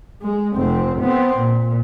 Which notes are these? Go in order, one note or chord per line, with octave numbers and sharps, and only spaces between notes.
G#3
F1 C4
B3 C4
A#2